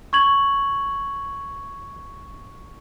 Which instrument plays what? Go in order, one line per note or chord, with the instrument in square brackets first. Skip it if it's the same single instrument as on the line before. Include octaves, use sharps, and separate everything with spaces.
[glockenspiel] C#6 G#6 F#7